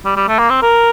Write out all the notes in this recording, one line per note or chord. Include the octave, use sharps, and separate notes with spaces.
G3
G3
A3
A#3
C4
A#4